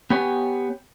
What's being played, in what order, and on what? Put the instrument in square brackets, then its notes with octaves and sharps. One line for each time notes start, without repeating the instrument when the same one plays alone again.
[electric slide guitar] B3 G4 C#5 G#5